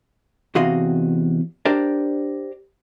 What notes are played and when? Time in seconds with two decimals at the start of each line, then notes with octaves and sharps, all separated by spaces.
0.55 E2 C3 F#4 D#5 F5 C6
1.65 D4 G4 A#4 C5 D5